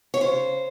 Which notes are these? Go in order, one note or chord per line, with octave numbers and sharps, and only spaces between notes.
C#5
C#3 C5